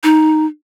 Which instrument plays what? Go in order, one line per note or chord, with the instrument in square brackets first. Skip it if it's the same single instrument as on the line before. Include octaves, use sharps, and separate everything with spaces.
[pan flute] D#4